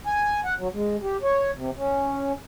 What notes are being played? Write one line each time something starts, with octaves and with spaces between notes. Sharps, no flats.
G#5
F#5
F#3
G#3
G4
C#5
C3
C#4